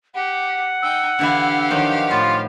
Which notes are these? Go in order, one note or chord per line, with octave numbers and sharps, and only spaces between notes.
G4 F#5
D#4 G5 E6
D3 E3 E4 G4 F5
D#3 F3 F#3
A2 F4